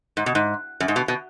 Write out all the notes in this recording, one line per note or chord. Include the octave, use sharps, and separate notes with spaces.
G#2
B2
G#2
F#2
G#2
B2
B2